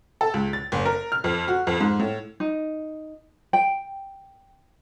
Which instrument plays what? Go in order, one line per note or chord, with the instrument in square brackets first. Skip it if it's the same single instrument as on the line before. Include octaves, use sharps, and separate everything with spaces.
[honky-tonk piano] A4
C#2
A6
F#1
A#4
F6
F2
F#4
F2
G#2
A2
[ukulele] D#4
G5